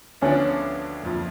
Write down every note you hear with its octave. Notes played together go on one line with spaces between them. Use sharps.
D2 D3 F3 B3 C#4 D4
F#1 F2 F3